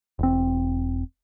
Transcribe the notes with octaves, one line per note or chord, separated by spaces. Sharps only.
E1 C4